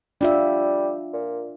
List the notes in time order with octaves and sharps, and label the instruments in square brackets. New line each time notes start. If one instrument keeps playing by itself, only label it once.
[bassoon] G3 [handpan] D4 F4 E5
[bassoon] A#2